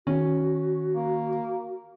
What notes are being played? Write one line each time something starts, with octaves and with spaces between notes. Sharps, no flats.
D#3 C#4 F#4
A#3